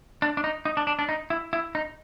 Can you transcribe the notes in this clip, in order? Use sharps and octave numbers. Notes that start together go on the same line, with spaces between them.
D4
D4
D#4
D#4
D4
D4
D4
D#4
E4
E4
D#4